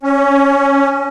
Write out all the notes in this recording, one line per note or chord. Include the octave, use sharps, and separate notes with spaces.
C#4